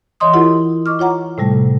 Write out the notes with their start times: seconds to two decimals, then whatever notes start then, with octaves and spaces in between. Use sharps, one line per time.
0.20 E3 C#5 D#5 C6 D#6
0.33 E4 F4 G4 A#4 F#5
0.86 D#5 C#6 D6 F6
0.99 F4 C#5 F#5 A#5
1.38 A2 C3 G3 A3
1.54 G3